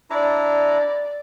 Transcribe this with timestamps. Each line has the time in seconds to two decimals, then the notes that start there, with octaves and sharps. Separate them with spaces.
0.10 D4 E4 D5 A#5